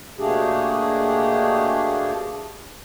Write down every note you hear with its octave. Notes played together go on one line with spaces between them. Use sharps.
B2 A3 A#3 D4 G4 G#4